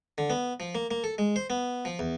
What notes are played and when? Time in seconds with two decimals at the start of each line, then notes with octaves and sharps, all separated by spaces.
0.18 D3
0.30 B3
0.60 F3
0.75 A#3
0.91 A#3
1.04 A4
1.18 G#3
1.36 C5
1.50 B3
1.85 F3
1.99 E2